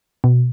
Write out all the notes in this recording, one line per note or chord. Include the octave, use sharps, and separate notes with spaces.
B2